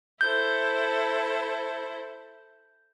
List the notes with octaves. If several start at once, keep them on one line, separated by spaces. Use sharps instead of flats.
E4 A4 C5 G6